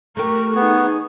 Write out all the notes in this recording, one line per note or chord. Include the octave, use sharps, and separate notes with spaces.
A3 G4 A#4 C#6
B3 D#4 G#4